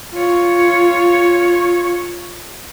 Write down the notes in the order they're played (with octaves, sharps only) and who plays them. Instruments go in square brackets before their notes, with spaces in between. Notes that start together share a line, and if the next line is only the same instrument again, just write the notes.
[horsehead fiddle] F4 C#5